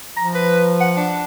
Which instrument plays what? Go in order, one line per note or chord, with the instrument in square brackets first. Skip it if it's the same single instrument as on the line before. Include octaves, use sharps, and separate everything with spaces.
[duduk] F3 [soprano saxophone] A#5
[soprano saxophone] B4
F#5
D4